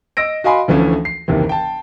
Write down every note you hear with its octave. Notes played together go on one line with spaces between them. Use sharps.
D#5 E6 A#6 D7
F#4 D#5 F5 G#5 B5 C6
D2 E3 F3 A3 C#4
C7
F#1 D#2 C3 D#3 E3
G5 A5